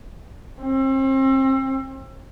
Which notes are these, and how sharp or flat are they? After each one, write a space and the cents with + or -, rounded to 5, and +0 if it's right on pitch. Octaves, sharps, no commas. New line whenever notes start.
C4 +35